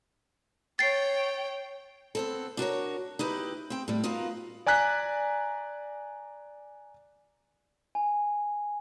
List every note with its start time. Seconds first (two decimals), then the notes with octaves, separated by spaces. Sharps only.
0.79 C#5 G5 A6 C7
2.15 B3 C4 A4
2.57 D4 F#4 A#4 C#5
3.19 D#4 E4 G4 B4
3.70 C4 G5
3.88 A2 G3
4.04 D#4 F4 F#4 A#4 B4 F5
4.66 D5 G#5 A#5 F#6 B6
7.95 G#5